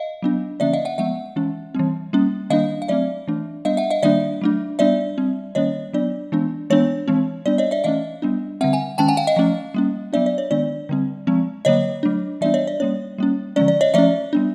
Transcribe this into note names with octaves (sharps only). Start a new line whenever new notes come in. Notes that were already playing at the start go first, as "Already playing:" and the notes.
Already playing: D#5 F5
F#3 B3 D4
D3 F3 A#3 C#4 D5 E5
D#5 F5
E5 F#5
F3 G#3 B3 E5 F#5
E3 G#3 C#4
E3 G3 C4
G3 A#3 C#4
D#3 G3 A#3 D4 D#5 F5
F5
F#3 A3 C4 D5 E5
E3 A3 D4
G3 B3 D4 D#5 F5
E5 F#5
D#5 F5
D#3 G3 A#3 D4 D5 E5
F#3 A3 D4
G3 B3 D4 D5 E5
G3 C4
D#3 G3 A#3 C#4 C#5 D#5
F#3 B3 D4 D5
E3 G#3 B3 D4
E3 G#3 B3 D4 C#5
E3 G#3 C4
G3 B3 D4 D5
C#5 D#5
D5 E5
E3 A3 C#4 D#5 F5
G3 B3 D4
D3 G3 C4 E5 F#5
F#5 G#5
D#3 G#3 C#4 G5 A5
F#5 G#5
F5 G5
D#5 F5
F3 A3 C#4
G3 A#3 C#4
F#3 B3 D4 D5 E5
D5
C#5
D#3 G#3 B3 D4 D5
D3 G3 C4
F3 G#3 C4
D3 F#3 A#3 C#5 D#5
F#3 A3 D4
E3 G3 B3 D4 D5 E5
C#5 D#5
D5
G3 A#3 C#4 C#5
G3 A#3 C#4
D3 F3 G#3 C#4 D5
D5
C#5 D#5
F3 A3 C#4 D5 E5
G3 B3 D4